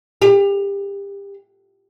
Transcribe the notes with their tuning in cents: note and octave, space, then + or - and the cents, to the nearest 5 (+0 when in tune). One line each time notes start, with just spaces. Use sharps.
G4 +30